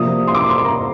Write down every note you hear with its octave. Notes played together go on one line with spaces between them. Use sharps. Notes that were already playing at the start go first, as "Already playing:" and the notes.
Already playing: C3 F3 A#3 D4 D#6
C6
D6
C6
A#5